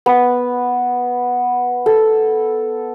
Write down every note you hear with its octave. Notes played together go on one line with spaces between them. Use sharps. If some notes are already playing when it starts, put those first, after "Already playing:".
B3
A4